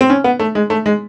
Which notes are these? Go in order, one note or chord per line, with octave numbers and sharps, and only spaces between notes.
C4
C#4
B3
A3
G#3
A3
G#3